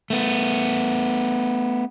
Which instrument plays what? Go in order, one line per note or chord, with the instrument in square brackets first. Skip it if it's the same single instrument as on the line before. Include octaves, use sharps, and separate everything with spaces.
[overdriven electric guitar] A3 B3